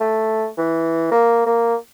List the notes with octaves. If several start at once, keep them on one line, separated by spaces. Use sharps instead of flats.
A3
E3
A#3
A#3